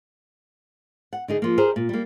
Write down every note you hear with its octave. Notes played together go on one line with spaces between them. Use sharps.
F#5
D3 D#4 G#4
F3 A#3
G4 G#4 A#4 C5
A#2
G3 A#3